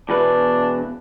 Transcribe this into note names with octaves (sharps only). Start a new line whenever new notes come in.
E2 B2 D4 B4